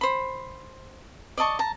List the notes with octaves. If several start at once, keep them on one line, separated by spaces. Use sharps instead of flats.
C5 B5
D5 D#5 A5 C#6
A5 A#5